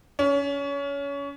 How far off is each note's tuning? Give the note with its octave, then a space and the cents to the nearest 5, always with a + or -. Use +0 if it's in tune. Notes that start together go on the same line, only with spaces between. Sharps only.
C#4 +25